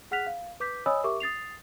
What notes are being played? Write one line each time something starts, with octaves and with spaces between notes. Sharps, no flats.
G#4 F#5 F6 F#6 B6 F7
F5
B4 D6 G6 B6
C#5 D#5 G#5 B5 D#6 E6
G4 A#4 E5 C#6 D6
D#6 A6 C7 F7